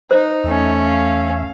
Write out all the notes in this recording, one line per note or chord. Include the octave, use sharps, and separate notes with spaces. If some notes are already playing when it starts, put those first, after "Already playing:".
D#4 C5
E2 A3 C#4 E5
F5